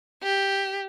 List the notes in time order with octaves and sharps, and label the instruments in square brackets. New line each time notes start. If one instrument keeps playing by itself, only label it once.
[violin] G4